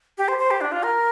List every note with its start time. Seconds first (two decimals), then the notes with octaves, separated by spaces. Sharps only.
0.18 G4
0.28 C5
0.39 C5
0.51 G4
0.61 D4
0.72 F4
0.83 A#4